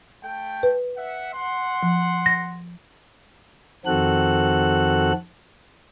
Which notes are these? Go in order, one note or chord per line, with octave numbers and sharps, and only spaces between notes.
A3 A4 G5
B4
E5 F#5
F#5 C6
F3
A#6
F2 D#3 C4 F#4 A4 F#6